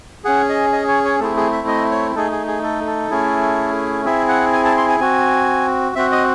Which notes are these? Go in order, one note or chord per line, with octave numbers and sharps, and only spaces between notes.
C#4 G#4 F#5
D#5
D#5
C#5
C#5
A3 C4 E4 G#4 A4
G#4
E5
D#5
C#5
A3 D#4 G#4 A4
G#4
G#4
A4
A4
A3 C#4 E4 G#4
C4 E4 G#4 E5
F#5
G#5
A5
C6
G#5
C4 F#4 G#5
C4 F#4 E5
D#5